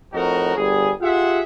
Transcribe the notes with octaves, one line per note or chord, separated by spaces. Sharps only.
F2 A2 D#4 F#4 A#4
G1 G3 G#4
F4 G4 G#4 E5 F#5